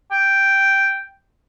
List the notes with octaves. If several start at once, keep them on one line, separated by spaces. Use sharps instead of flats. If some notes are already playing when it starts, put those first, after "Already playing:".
G5